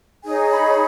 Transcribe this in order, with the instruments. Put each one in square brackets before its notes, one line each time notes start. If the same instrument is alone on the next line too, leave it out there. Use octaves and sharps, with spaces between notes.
[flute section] D#4 G#4 C#5 G#5
B5